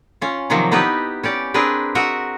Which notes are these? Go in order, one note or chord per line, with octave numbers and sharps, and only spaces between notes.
C#4 F4
C3 D#3 F3 F#3 A#3
B3 D#4 E4 G4 B4
C#4 G4 D5
C4 D4 G#4 A#4 B4
F#4 A#4 D#5 E5